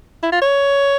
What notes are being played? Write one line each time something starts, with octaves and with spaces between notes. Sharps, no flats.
E4
F4
C#5